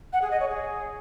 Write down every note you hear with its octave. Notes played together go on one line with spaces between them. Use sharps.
F#5
G#4
D#5
C#5
G#4